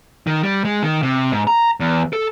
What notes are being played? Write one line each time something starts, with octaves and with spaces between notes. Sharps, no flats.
D#3
G3
G#3
D#3
C3
G#2
A#5
E2
A4